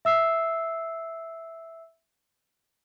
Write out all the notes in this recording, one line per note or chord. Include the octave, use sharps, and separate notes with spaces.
E5 E6 C7